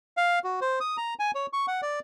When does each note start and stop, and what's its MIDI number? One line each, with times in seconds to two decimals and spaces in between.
0.17 0.39 77
0.44 0.60 66
0.61 0.79 72
0.80 0.97 87
0.97 1.14 82
1.19 1.31 80
1.35 1.46 73
1.53 1.66 85
1.67 1.81 78
1.82 2.00 74